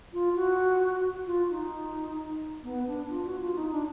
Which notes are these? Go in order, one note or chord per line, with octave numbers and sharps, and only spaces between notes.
F4
F#4
F4
D#4
B3
D4
F4
F#4
F4
D#4
D4